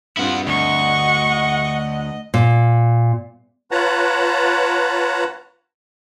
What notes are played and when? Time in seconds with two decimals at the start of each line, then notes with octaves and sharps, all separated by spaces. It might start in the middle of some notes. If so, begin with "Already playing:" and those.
0.17 G2 C4 E4 F4 F#5
0.47 D2 D#5 F#5 C#6
2.34 A#2
3.71 F4 B4 C#5 F#5 A5 A#5